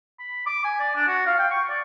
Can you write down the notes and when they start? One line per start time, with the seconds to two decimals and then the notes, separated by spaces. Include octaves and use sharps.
0.19 B5
0.46 D6
0.64 G#5
0.80 D5
0.95 D4
1.08 F#4
1.26 F5
1.39 G5
1.51 C#6
1.70 D5